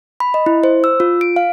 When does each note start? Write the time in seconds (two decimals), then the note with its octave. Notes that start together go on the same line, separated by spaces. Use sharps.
0.20 B5
0.34 D#5
0.46 E4
0.64 C5
0.84 E6
1.00 F4
1.21 D7
1.36 F5